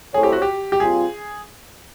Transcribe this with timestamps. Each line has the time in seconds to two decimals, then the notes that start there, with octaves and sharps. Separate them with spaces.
0.14 A3 C4 E4 G#4 A4 C#5
0.23 G4
0.32 F#4
0.42 G4
0.72 G4
0.80 A#2 G3 C4 F4 G#4